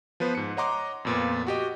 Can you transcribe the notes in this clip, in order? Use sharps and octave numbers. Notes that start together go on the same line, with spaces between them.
F3 B3 B4 C5
G#2 C#7
C#5 D#5 F#5 A#5 C6 D6
F2 A#2 B3
F#4 G4 D#5